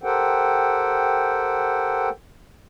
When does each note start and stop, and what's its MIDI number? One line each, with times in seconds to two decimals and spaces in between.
0.03 2.09 67
0.03 2.09 69
0.03 2.09 70
0.03 2.09 72
0.03 2.09 78
0.03 2.09 79